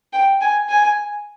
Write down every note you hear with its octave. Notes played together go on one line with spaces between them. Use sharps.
G5
G#5
G#5